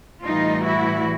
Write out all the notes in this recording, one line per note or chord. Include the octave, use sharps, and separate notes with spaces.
A2 E3 G3 D#4 F4
E4 F#4